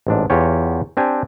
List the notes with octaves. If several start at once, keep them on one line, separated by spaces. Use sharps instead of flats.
A1 G#2 D4
E2 F4 G4 C#5
C4 D4 G4 G#5